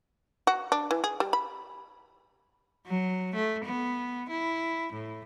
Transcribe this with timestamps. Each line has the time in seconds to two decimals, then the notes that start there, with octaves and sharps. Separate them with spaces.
0.47 F#4
0.72 D4
0.91 E3
1.04 G#4
1.20 G3
1.33 B5
2.87 F#3
3.35 A3
3.65 B3
4.30 E4
4.93 A2